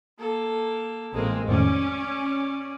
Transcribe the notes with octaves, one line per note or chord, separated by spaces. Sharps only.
A#3 A4
A1 G#3 A#3 C4
F2 A2 D#3 C#4 D5